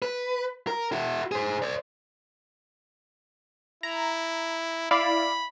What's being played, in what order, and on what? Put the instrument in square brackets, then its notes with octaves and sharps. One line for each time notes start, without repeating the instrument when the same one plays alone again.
[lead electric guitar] B4
A#4
E4 F#4
G#4 C5
C5 D5
[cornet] E4 [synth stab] A#5
[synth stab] E4 D5 F5 [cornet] B5